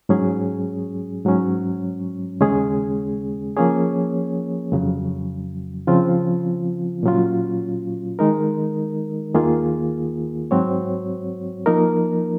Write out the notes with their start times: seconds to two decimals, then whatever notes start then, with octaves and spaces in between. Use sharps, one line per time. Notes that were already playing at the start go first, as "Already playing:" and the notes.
0.09 G#2 F#3 C#4 G#4
1.25 G#2 F#3 C#4
2.41 D#2 C#3 G#3 C#4 G#4
3.57 F3 A#3 C#4 G#4 C#5
4.72 F2 C#3 F#3
5.87 C#3 F3 C4 F4
7.03 A#2 F#3 C#4 F4
8.19 D#3 G#3 D#4 A#4
9.35 D#2 D#3 A#3 F4 G#4
10.51 G#2 F#3 C4 F#4 C#5
11.66 F3 A#3 D#4 A#4